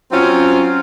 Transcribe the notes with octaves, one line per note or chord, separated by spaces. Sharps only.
F#3 C4 C#4 F4